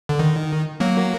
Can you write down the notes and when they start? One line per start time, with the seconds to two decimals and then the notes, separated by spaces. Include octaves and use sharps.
0.09 D3
0.19 D#3
0.80 F#3 A#3